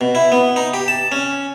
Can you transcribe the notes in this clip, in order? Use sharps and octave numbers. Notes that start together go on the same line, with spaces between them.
B2
E4
B3
D#4
G4
A5
C#4